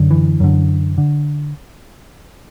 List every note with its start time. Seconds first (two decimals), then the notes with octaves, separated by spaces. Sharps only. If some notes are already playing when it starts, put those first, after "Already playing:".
Already playing: F#2 D3
0.11 E3
0.40 F#2 D3
0.98 D3